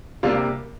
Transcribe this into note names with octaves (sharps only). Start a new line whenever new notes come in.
C3 G3 A#3 D4 F4